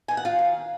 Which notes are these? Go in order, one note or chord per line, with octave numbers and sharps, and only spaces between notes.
D#3 G#5
F#5
F4 F5
D#3